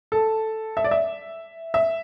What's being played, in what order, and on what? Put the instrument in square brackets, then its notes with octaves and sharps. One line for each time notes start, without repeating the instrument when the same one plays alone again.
[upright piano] A4
E5
D5
E5
E5